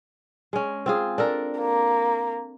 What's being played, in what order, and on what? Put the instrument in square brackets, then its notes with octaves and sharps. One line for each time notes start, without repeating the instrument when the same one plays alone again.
[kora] G#3 C#4
C4 F4 G#4
D4 A4 A#4
[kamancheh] A#3